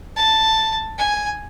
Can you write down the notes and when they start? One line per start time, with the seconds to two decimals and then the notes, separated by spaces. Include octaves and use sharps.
0.16 A5
0.98 G#5